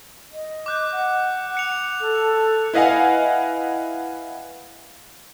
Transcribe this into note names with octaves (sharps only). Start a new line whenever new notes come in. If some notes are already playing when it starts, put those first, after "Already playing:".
D#5
D6 F#6 G6
F#5
F#6 C#7 F7
A4
E4 B4 D#5 F5 F#5 G#5